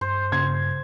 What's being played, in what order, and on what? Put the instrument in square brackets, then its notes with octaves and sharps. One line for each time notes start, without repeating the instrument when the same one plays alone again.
[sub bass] G2 [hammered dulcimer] C5
[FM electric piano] C#3 [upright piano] G#6